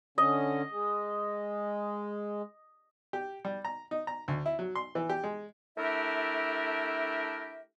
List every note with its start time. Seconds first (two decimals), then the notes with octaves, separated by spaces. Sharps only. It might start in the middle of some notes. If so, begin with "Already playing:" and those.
0.18 D3 C#4 D#5
0.71 G#3
3.13 G4
3.45 G3
3.65 A#5
3.91 D#4
4.07 A#5
4.28 D2
4.46 E4
4.59 F#3
4.75 C6
4.95 E3
5.09 G4
5.24 G#3
5.78 A3 D4 E4 G4 A#4 E5